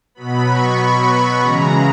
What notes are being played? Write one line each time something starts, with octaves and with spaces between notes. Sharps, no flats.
B2 F#3 B3 B5
C#6
C#3 E3 G#3 A#5